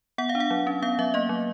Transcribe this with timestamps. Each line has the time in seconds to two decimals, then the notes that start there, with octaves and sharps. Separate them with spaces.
0.18 B3 F#5
0.29 F5
0.35 D4
0.40 F#5
0.51 F#3
0.67 C#4
0.82 B3 F5
0.99 F#3 E5
1.14 A#3 D#5
1.29 F#3